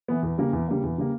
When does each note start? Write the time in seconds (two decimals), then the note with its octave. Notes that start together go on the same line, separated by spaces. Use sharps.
0.08 E3 B3
0.23 E2
0.38 C#3 G3 A#3
0.53 E2
0.68 C#3 G3 A#3
0.83 E2
0.98 C#3 G3 A#3